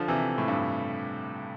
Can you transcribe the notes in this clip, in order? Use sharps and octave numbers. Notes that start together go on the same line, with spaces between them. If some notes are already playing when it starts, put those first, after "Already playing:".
Already playing: D3 F3
C3 E3
A2
G2